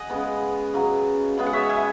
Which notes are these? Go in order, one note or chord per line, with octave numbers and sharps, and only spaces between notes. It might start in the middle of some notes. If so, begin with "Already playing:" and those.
Already playing: D#5 F#5 G#5
C#3 G#3 B3
C#3 F#3 B3
C#3 G#3 B3
F#5
C#5 E5
E5 G#5